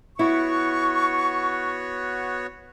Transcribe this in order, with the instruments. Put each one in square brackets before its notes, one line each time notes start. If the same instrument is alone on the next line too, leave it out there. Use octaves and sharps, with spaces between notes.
[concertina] B3 F#4 C#5 [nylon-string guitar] E4 [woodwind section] C#6